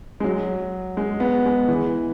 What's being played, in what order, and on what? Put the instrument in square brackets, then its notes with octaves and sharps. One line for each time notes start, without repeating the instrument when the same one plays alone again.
[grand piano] G#3
F#3
G#3
B3
G#3
E3